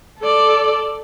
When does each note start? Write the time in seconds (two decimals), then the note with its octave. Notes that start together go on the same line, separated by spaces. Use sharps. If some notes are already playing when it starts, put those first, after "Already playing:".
0.20 A4 D5